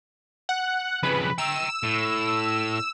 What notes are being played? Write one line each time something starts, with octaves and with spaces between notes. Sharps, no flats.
F#5
F2 C#3 B4
G5 A#5 E6
A2